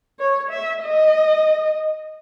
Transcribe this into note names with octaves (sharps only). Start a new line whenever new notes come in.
C#5
E5
D#5